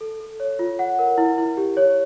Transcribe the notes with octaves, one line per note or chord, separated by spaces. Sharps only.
A4
A4
C#5
F4
F#5
A#4
E4
E4
G4
C#5